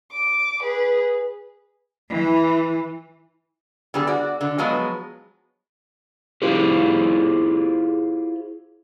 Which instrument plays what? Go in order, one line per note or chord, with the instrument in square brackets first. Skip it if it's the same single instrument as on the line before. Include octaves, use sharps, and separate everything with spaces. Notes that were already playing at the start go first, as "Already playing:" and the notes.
[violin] D6
G#4 B4
[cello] E3
[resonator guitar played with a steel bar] D3 G3 B3 G#4
F#4 D5
D3
F3 F#3 G#3 B3
[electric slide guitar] E4 F4 G4 G#4 C5